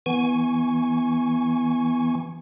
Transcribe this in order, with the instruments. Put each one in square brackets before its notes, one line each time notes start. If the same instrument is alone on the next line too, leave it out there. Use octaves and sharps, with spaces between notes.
[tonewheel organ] E3 B3 G#5 C#6